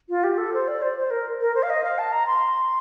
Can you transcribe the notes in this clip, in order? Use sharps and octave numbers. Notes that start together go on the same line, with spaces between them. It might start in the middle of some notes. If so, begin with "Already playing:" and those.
F4
G4
A4
C5
D5
C5
C5
A#4
A#4
C5
F5
D#5
F5
A5
A#5
C6